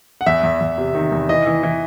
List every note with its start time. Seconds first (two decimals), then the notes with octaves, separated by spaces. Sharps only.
0.21 F#5
0.26 E2 E5
0.43 E2
0.61 E2
0.78 C3
0.95 D#3
1.12 E2
1.29 E3 D#5
1.47 E3
1.63 E3